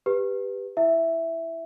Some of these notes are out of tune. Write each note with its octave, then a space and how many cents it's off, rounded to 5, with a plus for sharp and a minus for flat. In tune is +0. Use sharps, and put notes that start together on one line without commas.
G4 +10 B4 +0
E4 +0 E5 +0